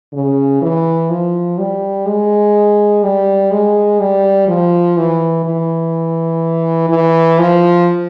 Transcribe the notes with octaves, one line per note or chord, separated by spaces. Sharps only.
C#3
E3
F3
G3
G#3
G3
G#3
G3
F3
E3
E3
E3
F3